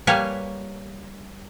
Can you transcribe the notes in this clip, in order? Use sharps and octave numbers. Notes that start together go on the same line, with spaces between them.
G3 A#3 B4 C#5 G#5 A5